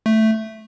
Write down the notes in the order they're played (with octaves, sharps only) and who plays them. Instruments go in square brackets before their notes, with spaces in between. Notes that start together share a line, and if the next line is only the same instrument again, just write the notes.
[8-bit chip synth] A3